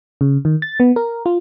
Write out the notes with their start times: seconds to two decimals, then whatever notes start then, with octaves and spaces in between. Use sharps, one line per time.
0.21 C#3
0.45 D#3
0.62 A6
0.80 B3
0.96 A#4
1.26 F4